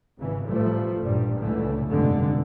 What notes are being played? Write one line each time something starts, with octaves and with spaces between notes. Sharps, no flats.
G#1 C#3 E3
A1 F3 G3 A3
A1 G2 A#2 G3
C#2 D3 E3 A3
F1 G2 B2 D3 G#3